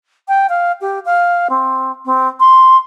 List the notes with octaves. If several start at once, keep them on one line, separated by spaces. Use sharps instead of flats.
G5
F5
G4
F5
C4
C4
C6